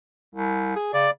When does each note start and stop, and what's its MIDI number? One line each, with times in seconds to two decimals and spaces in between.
0.35 0.71 36
0.76 0.90 68
0.94 1.08 49
0.94 1.10 74